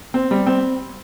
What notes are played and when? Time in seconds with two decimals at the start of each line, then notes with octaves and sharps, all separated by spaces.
0.14 C4
0.31 G3
0.47 C4